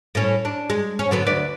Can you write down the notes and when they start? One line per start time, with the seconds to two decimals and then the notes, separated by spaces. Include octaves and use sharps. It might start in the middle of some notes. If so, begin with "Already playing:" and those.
0.15 A2 C#4
0.45 D4
0.70 G#3
0.99 C#4
1.11 D3 F#3 B3
1.26 D2 B4 D5